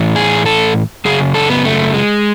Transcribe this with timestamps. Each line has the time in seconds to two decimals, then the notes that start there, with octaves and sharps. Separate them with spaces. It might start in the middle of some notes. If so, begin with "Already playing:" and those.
Already playing: A2 E3
0.16 G#4
0.46 A4
1.05 F#2 C#3 G#4
1.34 A4
1.50 B3
1.65 A3
1.94 G#3